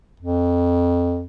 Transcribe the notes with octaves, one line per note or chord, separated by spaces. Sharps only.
F2